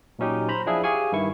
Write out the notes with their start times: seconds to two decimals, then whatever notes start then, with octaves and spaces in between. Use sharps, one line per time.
0.19 A#2 F#3 C#4 D#4 G4
0.49 C5 A#5 B5
0.66 F3 D4 E4 G#4 E5 F5
0.84 G4 G#4 F5 G#5 C#6
1.12 G2 D#3 E4 C#6